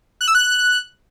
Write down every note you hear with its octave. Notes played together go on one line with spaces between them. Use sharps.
F#6
E6
F#6